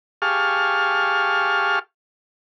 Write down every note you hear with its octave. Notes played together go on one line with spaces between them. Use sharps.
G4 G#4 F5 A5 C#6 F6